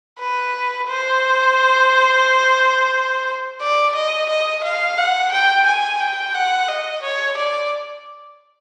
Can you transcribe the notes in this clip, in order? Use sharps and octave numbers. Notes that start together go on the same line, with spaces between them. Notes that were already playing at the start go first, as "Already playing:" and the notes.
B4
C5
D5
D#5
D#5
F5
F#5
G5
G#5
G5
F#5
D#5
C#5
D5